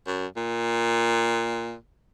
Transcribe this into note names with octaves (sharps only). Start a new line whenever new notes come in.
F#2
A#2